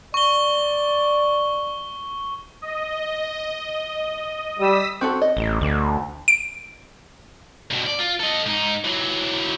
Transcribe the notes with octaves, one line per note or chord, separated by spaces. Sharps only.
D5 C#6 G7
D#5
G3 D#6 E6 B6
C4 F#4 A4
D#5
A1
D2
D7
G2 B2
D5
F4
A4 D#5
G#2 D#4
E3 F#3